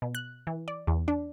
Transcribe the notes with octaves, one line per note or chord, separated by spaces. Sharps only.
B2
F#6
E3
D5
E2
D4